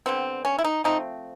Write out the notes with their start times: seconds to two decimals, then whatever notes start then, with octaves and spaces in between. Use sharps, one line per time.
0.06 D3 G3 B3 C4
0.45 C#4
0.59 E4
0.64 D#4
0.84 F3 A3 C4 D#4